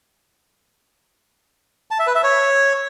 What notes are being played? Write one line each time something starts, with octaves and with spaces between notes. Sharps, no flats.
A5
E5
B4
E5
C#5